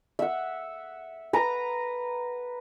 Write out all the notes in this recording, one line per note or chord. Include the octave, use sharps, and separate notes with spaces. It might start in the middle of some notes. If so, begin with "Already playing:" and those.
E5 F#5
B4 A#5